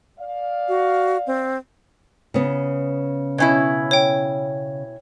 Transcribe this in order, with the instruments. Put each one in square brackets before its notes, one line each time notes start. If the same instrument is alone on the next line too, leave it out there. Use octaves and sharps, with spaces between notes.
[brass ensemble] D5 F5
[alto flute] F#4
C4
[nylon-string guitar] C#3 B3
[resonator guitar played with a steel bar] B2 C#4 E4
[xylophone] C#5 G5